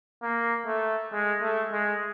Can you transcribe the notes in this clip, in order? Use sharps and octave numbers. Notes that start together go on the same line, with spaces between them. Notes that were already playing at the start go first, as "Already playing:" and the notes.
A#3
A3
G#3
A3
G#3